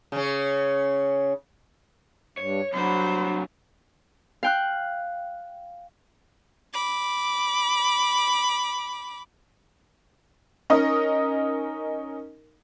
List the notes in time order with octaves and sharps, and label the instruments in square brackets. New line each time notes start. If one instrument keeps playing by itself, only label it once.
[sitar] C#3 C#4
[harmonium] G2 [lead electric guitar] C#5
[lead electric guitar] C2 D4 [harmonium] F#3 [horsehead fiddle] C5 B5
[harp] F5 G5 F#6
[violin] B5 D6
[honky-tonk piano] C#4 D#4 A#4 D#5